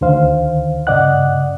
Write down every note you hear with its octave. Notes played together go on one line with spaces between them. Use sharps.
D2 D3 D#3 C5 F5
G2 C#3 D5 D#5 F#5 F#6